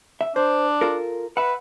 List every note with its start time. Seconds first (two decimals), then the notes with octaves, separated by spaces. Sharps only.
0.21 E5
0.36 D4 C5
0.81 F4 A4 A#4
1.37 B4 E5 F#5